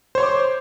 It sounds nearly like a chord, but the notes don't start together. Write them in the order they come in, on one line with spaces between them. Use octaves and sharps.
C5 C#5 C6 D6